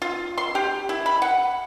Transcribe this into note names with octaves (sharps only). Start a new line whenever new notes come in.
F4
C6
G4
E4
B5
F#5